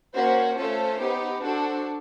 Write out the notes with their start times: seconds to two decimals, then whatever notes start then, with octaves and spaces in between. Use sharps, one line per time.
0.14 A#3 C#4 F#4 C5
0.57 A3 C#4 F4 A4 C5
0.99 B3 D#4 G4
1.42 D4 F#4 A4 C5